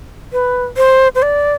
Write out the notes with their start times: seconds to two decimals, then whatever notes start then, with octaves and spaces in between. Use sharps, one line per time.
0.32 B4
0.77 C5
1.15 C5
1.22 D5